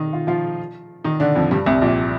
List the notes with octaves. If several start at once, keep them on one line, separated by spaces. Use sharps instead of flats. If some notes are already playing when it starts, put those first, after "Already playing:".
Already playing: D#3 D#4
F4
F3 F4
D#3 D#4
D3 D4
F2 F3
G2 G3
C2 C3
A#1 A#2